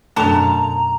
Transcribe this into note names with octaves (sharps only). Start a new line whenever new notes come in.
F#2 B2 A3 D4 A4 A5 A#5 D6